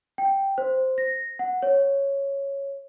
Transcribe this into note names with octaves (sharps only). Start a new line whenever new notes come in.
G5
C5
A#6
F#5
C#5